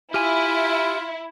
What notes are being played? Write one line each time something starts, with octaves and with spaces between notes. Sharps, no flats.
E4 F4 G4 G#5